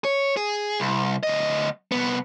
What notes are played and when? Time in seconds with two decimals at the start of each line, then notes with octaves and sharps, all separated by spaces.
0.05 C#5
0.37 G#4
0.80 C2
1.23 D2 D#5
1.92 C2 B3